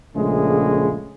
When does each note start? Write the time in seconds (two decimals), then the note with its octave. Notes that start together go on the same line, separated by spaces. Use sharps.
0.15 A#1 C#3 G#3 A3